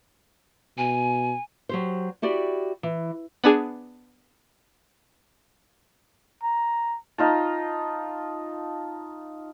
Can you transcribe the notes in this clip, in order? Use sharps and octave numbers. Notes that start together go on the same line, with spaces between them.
B2 G#5
F#3 G4 C5
E4 F#4 G4 D5
E3
B3 D4 G#4
A#5
D#4 F4 A5